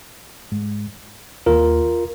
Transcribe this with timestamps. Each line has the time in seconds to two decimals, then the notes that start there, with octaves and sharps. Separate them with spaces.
0.52 G#2 G#3
1.46 D#2 D#3 A#3 F4 A#4